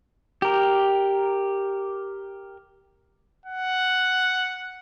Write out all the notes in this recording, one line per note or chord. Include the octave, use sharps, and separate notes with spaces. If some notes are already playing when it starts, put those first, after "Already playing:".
G4 A#4
F#5